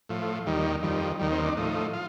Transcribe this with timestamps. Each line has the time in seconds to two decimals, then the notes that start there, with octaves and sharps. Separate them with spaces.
0.09 A2 F3
0.46 D#2 D#3 G3
0.83 F2 D#3 G3
1.19 D#2 D#3 G3
1.32 C4
1.45 D4
1.57 A2 F3 D#4
1.93 F4